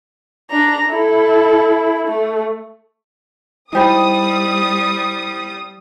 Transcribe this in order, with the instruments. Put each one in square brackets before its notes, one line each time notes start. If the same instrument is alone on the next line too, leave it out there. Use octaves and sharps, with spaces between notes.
[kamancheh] D4 A#5
E4 A4
A3
[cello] G3 [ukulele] D#4 G4 D5 [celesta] E4 C5 B5 [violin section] D#6